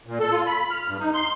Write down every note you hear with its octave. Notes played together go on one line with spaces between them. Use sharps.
A#2
A4
F4
B5
F6
G2
D#4
C6